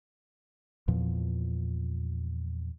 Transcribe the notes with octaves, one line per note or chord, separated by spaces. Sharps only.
E2 A#2 F3